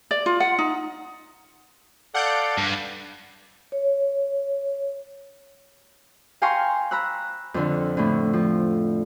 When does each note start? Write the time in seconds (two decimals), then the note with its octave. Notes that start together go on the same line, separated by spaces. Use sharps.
0.11 D5
0.26 F4
0.40 F#5
0.58 D#4
2.14 A4 D5 F5 F#5 G6 D7
2.58 G2
3.72 C#5
6.42 F5 G5 G#5 A#5 C6 C#6
6.91 A#5 B5 E6 F#6
7.54 F2 D3
7.97 A2 D3
8.33 F3